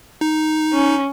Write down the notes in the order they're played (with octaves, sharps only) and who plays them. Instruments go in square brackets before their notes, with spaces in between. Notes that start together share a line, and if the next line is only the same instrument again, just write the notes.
[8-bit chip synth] D#4
[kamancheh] C#4